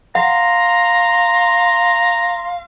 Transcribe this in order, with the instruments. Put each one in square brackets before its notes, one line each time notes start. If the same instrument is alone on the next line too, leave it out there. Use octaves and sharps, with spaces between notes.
[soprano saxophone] F5 [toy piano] F#5 [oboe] A#5 [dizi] C6